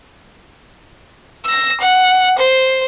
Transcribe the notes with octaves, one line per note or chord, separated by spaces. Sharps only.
E6 A#6
F#5
C5